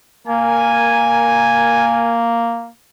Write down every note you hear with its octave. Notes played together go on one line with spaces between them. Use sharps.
A#3 A#4 G#5